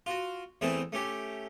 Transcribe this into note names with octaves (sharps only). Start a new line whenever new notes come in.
F4 F#4
E2 E3 A3 C4 G#4 A5
A3 C#4 G4